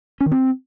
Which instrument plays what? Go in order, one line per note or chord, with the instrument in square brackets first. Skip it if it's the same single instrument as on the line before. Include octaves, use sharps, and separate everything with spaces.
[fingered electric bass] C#4
D#3
C4